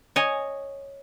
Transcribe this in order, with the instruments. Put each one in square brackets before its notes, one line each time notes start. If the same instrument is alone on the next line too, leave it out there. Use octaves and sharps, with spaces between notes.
[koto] C#5 D#5 G#5